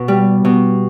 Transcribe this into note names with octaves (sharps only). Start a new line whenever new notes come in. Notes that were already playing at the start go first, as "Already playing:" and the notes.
Already playing: B2
G3
B2